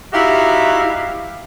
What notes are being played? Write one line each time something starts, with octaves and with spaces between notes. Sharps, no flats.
D#4 E4 F#4 G4 E5 F5